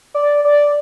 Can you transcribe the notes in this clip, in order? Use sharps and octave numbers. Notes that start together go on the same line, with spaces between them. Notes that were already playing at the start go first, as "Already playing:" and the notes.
D5
D5